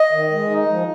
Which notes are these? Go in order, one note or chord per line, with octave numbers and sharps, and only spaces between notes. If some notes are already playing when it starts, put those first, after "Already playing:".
Already playing: D#5
D#3
G#3
D#4
F3